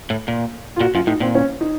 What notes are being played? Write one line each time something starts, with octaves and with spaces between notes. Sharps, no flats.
A2
A#2
F4
A#2 F#4
F#2 F4
A2 D#4
A#2 C4
C#4
D#4